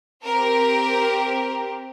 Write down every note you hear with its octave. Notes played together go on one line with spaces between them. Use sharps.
C4 G4 A#4